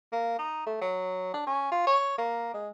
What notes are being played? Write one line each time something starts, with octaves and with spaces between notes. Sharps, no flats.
A#3
D#4
A3
F#3
D4
C#4
F4
C#5
A#3
G#3